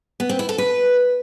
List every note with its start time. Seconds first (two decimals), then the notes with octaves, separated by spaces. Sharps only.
0.20 B3
0.29 C4
0.39 E4
0.49 A4
0.58 B4